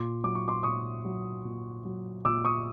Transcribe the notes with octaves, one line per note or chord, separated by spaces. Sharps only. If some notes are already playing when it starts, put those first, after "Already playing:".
Already playing: A#2 C6 D6
F#3 D6
C#6
C6 D6
A#2 C#6 D#6
F#3
A#2
F#3
A#2 D6 E6
C#6 D#6